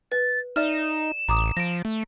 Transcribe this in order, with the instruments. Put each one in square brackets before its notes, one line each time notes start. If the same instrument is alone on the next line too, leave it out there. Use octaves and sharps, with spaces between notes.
[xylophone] B4 [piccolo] A6
[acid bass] D#4 [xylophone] D5 E5 F6 [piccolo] E7
[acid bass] A1 [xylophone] A#5 D6 D#6
[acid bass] F3 [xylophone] A#6 D7
[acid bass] A3